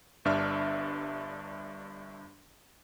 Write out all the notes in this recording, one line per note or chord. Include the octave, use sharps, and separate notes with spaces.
G1 G2 D4 E5 F6